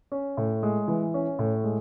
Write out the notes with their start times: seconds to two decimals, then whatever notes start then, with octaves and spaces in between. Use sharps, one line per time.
0.12 C#4
0.37 A2
0.63 G#3
0.88 E3
1.14 C#4
1.39 A2
1.64 G#3